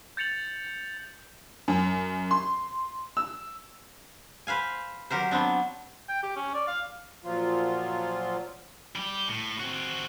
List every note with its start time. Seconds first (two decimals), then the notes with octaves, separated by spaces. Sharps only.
0.17 G6 A6 C#7 F7 F#7
1.68 F#2
2.31 C6
3.17 E6
4.47 B4 C5 F5 G#5
5.11 F#3 G4 A#4 C5
5.31 F#3 B3 C4 D4
6.09 G5
6.23 G4
6.36 C#4
6.54 D5
6.68 F5
7.24 A#2 F3 F#3 F4
8.96 G3 G4
9.28 A2
9.60 C4 F#4